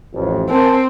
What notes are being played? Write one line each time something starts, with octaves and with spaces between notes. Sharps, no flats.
A1 F2
C4 A#4 G#5 A5